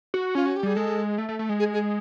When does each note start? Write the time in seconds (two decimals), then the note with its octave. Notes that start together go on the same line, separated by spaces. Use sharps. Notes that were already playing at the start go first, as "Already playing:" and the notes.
0.14 F#4
0.35 C#4 F4
0.46 F#4
0.56 G4
0.63 G3 G#4
0.76 G#3 A4
1.18 A3
1.29 A3
1.39 A3
1.49 G#3
1.59 G#4
1.74 G#4